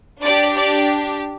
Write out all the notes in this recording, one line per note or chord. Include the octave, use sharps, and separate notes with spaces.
D4 G4 D5
D5